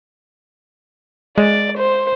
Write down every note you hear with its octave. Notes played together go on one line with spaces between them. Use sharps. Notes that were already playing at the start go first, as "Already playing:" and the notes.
G#3 D5
C5